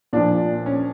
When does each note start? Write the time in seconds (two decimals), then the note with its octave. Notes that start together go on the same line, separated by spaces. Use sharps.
0.13 A#2 F3 D4
0.66 C#4